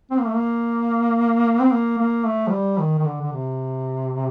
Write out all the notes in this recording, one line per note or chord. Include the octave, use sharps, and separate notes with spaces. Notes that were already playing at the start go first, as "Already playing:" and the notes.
C4
A#3
A3
A#3
C4
A#3
A#3
A3
F3
G3
D#3
D#3
D3
D3
C3